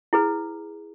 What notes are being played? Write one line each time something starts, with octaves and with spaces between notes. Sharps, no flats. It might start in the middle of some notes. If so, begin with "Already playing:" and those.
E4 G#4 B4